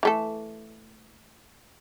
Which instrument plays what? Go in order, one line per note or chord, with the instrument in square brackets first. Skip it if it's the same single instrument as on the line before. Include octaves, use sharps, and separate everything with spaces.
[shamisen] E3 A3 A4